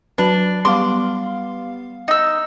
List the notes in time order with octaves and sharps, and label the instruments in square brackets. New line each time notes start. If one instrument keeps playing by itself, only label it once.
[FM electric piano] F#3 B4 [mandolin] D4
[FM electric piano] G3 B3 F5 [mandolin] C6 D6
[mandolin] D#4 E6